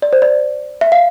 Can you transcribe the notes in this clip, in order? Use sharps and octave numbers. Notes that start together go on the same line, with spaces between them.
D5
C5
D5
E5
F5